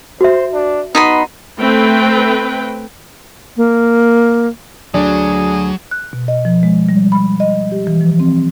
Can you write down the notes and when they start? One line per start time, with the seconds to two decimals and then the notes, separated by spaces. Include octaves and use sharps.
0.21 F#4 C5 E5
0.54 D4
0.95 B3 D#4 B5 C6
1.58 A3 C4 B4 G5
3.57 A#3
4.94 D2 F#3 D4 G#4
5.91 F#6
6.13 B2
6.28 D#5
6.45 F3
6.63 G#3
6.89 G3
7.12 B5
7.40 D#5
7.72 G4
7.87 E3
8.01 F3
8.20 C4